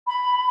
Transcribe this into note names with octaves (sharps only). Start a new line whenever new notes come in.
B5